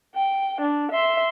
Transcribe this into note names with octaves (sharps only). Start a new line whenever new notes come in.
G5
D4
E5 C6